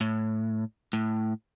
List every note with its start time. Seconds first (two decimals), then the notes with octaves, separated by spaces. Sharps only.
0.01 A2
0.93 A2